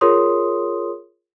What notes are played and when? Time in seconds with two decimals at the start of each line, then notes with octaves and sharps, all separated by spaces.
0.01 F4 G#4 A#4 C#5 C6 D#6